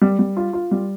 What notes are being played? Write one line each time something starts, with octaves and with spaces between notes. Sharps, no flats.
G3
G3
F4
F4
G3